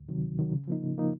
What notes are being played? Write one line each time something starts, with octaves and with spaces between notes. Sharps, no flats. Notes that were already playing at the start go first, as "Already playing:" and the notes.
Already playing: D2
C3 D#3 F#3
D2
C3 D#3 F#3
C#3
F3 A#3 D#4
C#3
F3 A#3 D#4